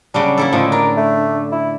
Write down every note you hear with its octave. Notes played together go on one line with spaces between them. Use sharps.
C#3 F#3 G3 D4
A#3 E4 A4
A2 D3 F3 G#3
D4 A#4
A3
E4